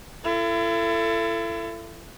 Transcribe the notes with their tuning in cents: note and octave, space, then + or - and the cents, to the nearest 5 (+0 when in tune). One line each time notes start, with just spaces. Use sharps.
E4 +40 A4 +20